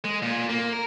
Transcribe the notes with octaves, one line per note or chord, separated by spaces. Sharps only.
G#3
A#2
A#3
A#4